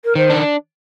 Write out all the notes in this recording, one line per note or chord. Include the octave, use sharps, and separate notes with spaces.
A#4
D#3 C5
D4